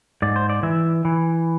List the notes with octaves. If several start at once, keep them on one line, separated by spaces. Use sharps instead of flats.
G#2 D5
C5
D5
E3 E5
E3